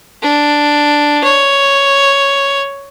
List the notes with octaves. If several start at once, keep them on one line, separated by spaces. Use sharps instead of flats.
D4
C#5